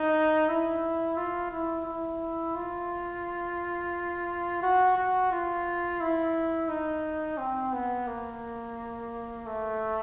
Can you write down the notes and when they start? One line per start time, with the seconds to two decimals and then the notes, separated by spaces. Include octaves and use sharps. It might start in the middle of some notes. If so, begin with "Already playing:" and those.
Already playing: D#4
0.48 E4
1.17 F4
1.51 E4
1.86 E4
2.55 F4
4.62 F#4
4.97 F#4
5.32 F4
6.01 E4
6.69 D#4
7.38 C4
7.72 B3
8.07 A#3
9.46 A3